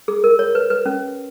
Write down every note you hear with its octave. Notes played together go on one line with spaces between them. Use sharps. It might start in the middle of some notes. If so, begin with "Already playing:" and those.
G#4
A#4
C#5
B4
B4
C#4